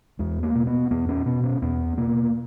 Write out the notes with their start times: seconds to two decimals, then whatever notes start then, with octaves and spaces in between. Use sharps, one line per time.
0.19 E2 G#3
0.43 A#3
0.55 B2
0.67 B3
0.91 E2 B3
1.09 C#4
1.26 B2 B3
1.44 C#4
1.62 E2 B3
1.98 B2 A#3